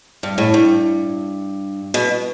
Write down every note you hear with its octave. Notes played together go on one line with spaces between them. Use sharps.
G2
A2
G2
B2